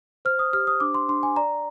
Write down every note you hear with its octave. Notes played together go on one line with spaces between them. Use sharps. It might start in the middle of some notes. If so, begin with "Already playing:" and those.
C5 F6
D#6
G4 F6
D#6
D4 D6
C6
D4 C6
G#5
D5 A#5